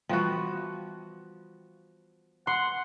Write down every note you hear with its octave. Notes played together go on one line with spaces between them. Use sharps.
E3 F3 G3 B3 F#4 G5
F#5 C6